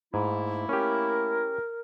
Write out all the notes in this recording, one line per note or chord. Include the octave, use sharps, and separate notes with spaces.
G#2 A3 A#3 E4
C#4 G4 A#4